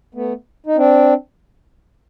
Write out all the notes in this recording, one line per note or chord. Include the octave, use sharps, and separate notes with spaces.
A3 B3
D#4
C4 D4